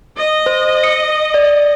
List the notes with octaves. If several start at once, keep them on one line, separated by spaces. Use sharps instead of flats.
D#5
C5
C#7
D5